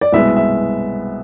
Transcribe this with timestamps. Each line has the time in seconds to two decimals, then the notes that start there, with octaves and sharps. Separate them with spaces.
0.01 D5
0.12 C2 B2 G#3 B3 E5
0.36 E5